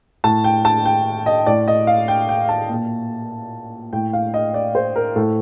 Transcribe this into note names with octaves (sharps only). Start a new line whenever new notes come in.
A2 A5
G5
A5
G5
D#5
A2 D5
D#5
F5
G5
G5
A5
A#2
A2 G5
F5
D#5
D5
C5
A#4
A2 A4